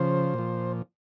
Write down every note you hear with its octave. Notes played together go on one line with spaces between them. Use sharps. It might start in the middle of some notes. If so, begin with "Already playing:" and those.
Already playing: C#3 F3 C5
A#2 F3